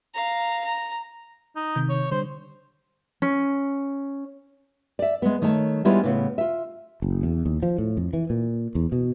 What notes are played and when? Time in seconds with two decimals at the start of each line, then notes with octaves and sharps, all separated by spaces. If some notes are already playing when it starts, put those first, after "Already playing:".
0.14 F5 A#5
0.65 A#5
1.56 D#4
1.75 C3 D#3 G6
1.89 C#5
2.11 D3 G3 C5
3.22 C#4
4.99 D5 E5
5.22 G#3 B3
5.42 D#3 A3 C#5 A5
5.85 G3 G#3 B3 C#4 E4 F4
6.04 A2 C#3 B3
6.38 F4 E5
7.02 F#1
7.23 E2
7.46 D#2
7.63 F3
7.78 A2
7.97 F2
8.13 E3
8.30 A#2
8.75 E2
8.92 B2